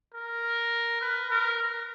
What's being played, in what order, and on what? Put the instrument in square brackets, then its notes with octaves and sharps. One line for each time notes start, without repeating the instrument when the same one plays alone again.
[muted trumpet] A#4
B4
A#4